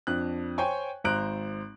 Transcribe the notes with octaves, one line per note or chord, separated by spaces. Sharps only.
F2 D4 F#6
C5 C#5 G5 G#5 C#6
G#1 C5 A#5 F#6 D7